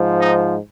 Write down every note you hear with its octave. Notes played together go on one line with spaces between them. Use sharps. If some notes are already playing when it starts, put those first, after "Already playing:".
Already playing: G#2 F3
D#4